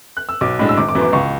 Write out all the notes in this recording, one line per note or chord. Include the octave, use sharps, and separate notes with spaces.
F#6
E6
B1 D6
A2 G#3 D4
E6
G#1 D6
D6
F#2 E3 B3 E4
D6
C#2 C#6